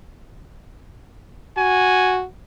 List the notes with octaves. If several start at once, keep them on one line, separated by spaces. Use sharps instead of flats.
F#4 G#5